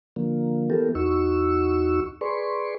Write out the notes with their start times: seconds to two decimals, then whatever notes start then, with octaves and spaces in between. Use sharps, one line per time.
0.16 D3 F3 A#3
0.70 E3 B3 G4 A4 A#4
0.95 E2 D#4 F#4 C#6 E6
2.21 G#4 B4 D5 C6 C#6